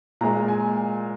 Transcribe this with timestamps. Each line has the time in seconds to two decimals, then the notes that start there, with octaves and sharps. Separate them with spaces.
0.21 A#2 G#3 A#5
0.48 G#5